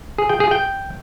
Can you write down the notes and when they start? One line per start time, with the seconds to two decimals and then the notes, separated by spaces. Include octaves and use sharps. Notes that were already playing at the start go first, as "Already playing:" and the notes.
0.18 G#4
0.29 G5
0.40 G#4
0.51 G5